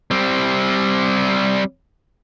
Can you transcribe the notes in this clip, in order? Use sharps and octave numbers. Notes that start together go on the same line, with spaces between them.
G3 C4